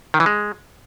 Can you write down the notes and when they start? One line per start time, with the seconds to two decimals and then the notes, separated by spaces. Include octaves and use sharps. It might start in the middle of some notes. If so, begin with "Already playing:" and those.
0.14 D#3
0.20 E3
0.26 G#3